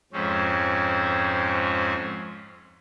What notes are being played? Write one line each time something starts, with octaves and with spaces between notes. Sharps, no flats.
F2 G#2 C4 C#4